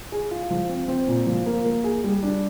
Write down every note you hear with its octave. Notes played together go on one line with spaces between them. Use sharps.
G#4
F4
F3
C4
C4
A#2
F3
A#3
A#3
G#4
G3
D4